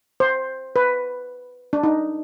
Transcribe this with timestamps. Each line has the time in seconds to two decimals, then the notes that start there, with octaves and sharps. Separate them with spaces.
0.20 C5
0.76 B4
1.73 D4
1.83 D#4